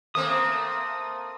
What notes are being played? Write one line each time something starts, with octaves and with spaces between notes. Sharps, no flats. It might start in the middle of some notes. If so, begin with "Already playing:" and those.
A3 A#3 C4 D#6